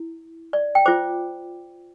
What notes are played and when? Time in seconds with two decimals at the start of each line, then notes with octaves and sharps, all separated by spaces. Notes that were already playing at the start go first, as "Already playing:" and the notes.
Already playing: E4
0.53 D5
0.75 G5
0.86 F4 C5 D6